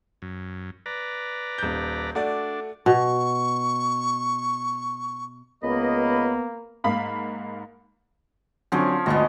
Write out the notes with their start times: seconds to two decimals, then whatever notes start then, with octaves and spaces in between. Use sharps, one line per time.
0.22 F#2
0.86 B4 D5 A#5
1.58 D#1 G6
2.15 A3 D4 F#4 D5
2.86 B2 C#6
5.63 C#2 A#3 B3 D#5 B5
6.84 G#2 A#3 F5 B5
8.72 D3 F3 F#3 C4 C#4
9.06 G#1 D2 B3 D#5 C#6